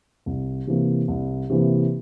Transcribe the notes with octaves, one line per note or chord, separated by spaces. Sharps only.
C2
C3 E3 A#3
C2
C3 E3 A#3